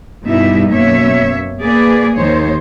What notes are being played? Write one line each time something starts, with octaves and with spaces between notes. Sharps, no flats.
G2 B2 G3 D#4 E4 E5
F#2 B2 A#3 C#5 E5
A#3 G#4 B4 D5
D#2 D#3 C5 C#5